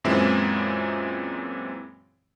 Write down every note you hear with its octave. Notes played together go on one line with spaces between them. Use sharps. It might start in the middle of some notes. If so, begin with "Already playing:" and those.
F#2 A#2 E3 G#3 C4 E4